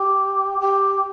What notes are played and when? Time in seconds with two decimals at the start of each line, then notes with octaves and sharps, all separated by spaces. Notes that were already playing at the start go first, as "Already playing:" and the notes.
Already playing: G4
0.60 G4